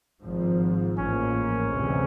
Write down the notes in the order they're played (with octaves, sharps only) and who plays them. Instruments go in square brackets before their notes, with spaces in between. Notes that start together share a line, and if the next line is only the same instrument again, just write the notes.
[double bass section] G#1 G#2 F3
[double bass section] A1 G#2 F3 A#3 [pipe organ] C#4
[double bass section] D2 C3 E3 G#3